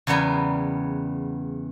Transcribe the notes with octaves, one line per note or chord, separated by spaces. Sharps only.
E2 C#3 G3 B3 A#4 G#5